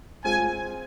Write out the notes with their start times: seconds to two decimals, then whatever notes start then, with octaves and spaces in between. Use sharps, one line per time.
0.24 G#3 C4 F4 G#5